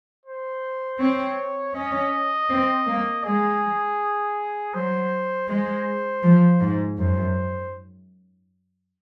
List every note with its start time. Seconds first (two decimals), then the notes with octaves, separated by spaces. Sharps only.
0.25 C5
1.00 C4 C#5
1.75 C#4 D#5
2.50 C4
2.87 A#3
3.24 G#3 G#4
4.73 F#3 C5
5.48 G#3 C5
6.23 F3
6.60 G#2
6.98 F#2 C5